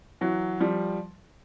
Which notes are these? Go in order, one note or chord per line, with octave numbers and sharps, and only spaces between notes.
E3 F#3
F3 G3